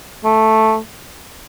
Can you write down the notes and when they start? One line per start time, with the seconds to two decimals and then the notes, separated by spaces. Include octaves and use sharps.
0.24 A3